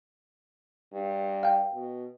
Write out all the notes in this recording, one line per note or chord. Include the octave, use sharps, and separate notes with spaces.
G2
F5 G5
B2